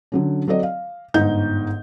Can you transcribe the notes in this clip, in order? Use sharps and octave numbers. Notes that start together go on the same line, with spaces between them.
D3 F#3 C#4
F#3 C4 A4 D5 D#5
F5
G1 G#2 D#4 G6